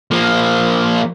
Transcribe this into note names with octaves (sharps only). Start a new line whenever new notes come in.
F3 A#3